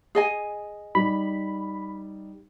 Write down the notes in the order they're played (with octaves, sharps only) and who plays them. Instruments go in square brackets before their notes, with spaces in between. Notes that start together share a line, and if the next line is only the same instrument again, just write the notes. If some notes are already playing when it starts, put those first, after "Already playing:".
[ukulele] G#4 D#5 G#5
[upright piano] G3 D#4 [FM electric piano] B5